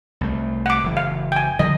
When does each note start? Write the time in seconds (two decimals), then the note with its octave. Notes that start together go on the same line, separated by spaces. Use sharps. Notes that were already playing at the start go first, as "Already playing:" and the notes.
0.21 C2 A3
0.66 F#5 D6
0.84 F#1 E3
0.97 F5
1.32 G5 G#5
1.59 D3 F3 G3 D#5